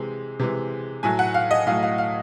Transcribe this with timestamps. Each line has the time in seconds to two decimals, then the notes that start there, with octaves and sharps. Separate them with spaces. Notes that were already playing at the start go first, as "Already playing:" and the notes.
Already playing: C3 E3 G#3
0.39 C3 E3 G#3
1.03 A2 F#3 A3 G#5
1.19 F#5
1.34 F5
1.51 D#5
1.66 A2 F#3 A3 F5
1.83 F5
1.98 F5